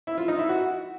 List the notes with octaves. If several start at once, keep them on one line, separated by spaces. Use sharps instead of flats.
E4
F4
D#4
E4
F#4